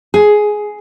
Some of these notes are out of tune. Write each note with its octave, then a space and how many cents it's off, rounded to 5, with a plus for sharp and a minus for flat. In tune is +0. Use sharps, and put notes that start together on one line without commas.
G#4 +10